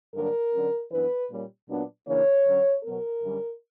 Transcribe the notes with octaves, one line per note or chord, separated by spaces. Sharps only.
G2 D3 F#3 A#3 D4 A#4
D3 F#3 C#4
F#2 E3 B3 D4 B4
A#2 G3 A#3 C#4
A#2 F#3 B3 D4
C#3 E3 A#3 D4 C#5
D3 F#3 C#4
B2 F#3 B3 A#4
F#2 D3 G3 C#4